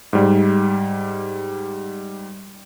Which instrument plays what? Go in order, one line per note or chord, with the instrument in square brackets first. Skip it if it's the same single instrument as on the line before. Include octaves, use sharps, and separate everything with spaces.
[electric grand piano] G#2 G3